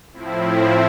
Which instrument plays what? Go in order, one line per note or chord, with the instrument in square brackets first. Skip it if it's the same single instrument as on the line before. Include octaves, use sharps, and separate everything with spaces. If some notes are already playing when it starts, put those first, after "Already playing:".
[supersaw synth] A2 F3 C4 E4